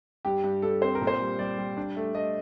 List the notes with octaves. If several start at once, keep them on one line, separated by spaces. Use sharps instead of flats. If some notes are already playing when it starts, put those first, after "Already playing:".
G2 G4
G2
G2 A4
C4 C5
A#4
A#2
C5
G3
G3 D5
G3
D4
A3
A3 D#5